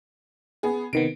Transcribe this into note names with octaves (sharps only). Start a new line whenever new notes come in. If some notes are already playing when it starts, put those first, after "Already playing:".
B3 G#4
C3 D#3 B3 D7